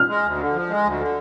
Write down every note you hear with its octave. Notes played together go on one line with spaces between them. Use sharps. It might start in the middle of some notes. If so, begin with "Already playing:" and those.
Already playing: F6
G#3
D2
D3
F3
G#3
D2
D3